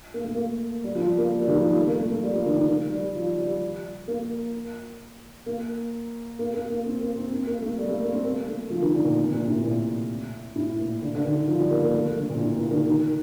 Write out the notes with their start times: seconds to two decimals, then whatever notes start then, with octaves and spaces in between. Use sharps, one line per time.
0.14 A#3
0.24 A3
0.35 A#3
0.84 G3
0.95 F3
1.07 G3
1.18 A#3
1.41 G3
1.48 D#3
1.53 F3
1.65 F3
1.76 A3
1.88 A#3
2.00 A3
2.11 A3
2.23 G3
2.34 F3
2.46 D#3
2.58 D#3
2.69 D#3
2.92 G3
3.15 F3
3.38 G3
4.08 A#3
5.46 A#3
6.39 A#3
6.54 A#3
6.70 A#3
6.86 C4
7.01 A#3
7.16 C4
7.32 C4
7.47 A#3
7.62 A3
7.78 G3
7.89 A3
8.01 A#3
8.12 C4
8.24 A#3
8.48 A3
8.70 F3
8.82 D#3
8.93 D3
9.05 A#2
9.17 C3
9.32 A#2
9.47 A2
9.57 C3
9.63 A#2
10.56 A2
10.79 A#2
11.02 D3
11.15 D3
11.25 D#3
11.48 F3
11.60 G3
11.71 A#3
11.83 A#3
11.94 A3
12.17 D3
12.29 A#2
12.41 A2
12.56 A#2
12.71 D#3
12.87 D#3